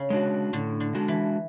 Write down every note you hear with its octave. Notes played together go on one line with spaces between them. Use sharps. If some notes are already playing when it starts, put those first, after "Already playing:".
Already playing: C#3
G#3 D4 F#4
A2 D3
D3
G#3 D4 F#4
E3